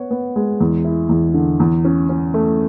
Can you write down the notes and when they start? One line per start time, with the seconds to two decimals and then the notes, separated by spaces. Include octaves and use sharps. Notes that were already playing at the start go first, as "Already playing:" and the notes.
Already playing: B3 C#5
0.11 B3
0.36 G#3
0.61 E2
0.85 E4
1.09 E2
1.34 D3
1.60 E2
1.85 C#4
2.09 C#4
2.34 A3